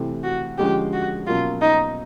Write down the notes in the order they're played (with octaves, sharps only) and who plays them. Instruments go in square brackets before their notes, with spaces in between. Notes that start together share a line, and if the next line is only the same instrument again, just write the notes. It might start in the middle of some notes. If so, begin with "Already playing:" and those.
Already playing: [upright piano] C3 E3 A3 C4
[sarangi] F#4
[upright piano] D3 F3 G#3 C#4 [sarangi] G4
[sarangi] F#4
[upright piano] B2 F#3 A#3 C#4 [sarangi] F4
[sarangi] D#4